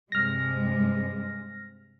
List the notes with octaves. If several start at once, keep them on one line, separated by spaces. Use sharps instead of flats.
G2 C3 G#3 F6 A#6